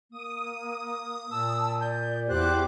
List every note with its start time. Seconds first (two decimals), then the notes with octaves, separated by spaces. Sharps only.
0.11 A#3 D#6
1.31 A#2 A5 E6
1.81 D5 G6
2.29 E2 G4 C5 D6 F#6